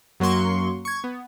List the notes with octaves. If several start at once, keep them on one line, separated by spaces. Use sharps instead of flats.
F#2 F#3 A#3 C6 C#6
C#6 G#6
B3